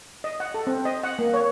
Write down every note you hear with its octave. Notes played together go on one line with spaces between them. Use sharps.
D#5
F#5
A4
C4
D#5
F#5
A#3
C#5